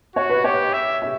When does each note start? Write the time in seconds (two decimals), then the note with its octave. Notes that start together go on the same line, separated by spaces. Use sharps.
0.16 F#4 C#5
0.30 B4
0.44 G4 C#5
0.73 E5
1.02 E5